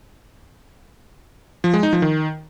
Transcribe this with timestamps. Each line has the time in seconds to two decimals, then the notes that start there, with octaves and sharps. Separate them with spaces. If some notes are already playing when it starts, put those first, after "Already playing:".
1.64 F3
1.74 G#3
1.83 D#4
1.93 F3
2.02 D#3